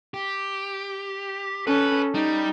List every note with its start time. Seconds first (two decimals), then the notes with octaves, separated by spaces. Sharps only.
0.14 G4
1.67 C#4 A4 B4
2.14 G3 D#4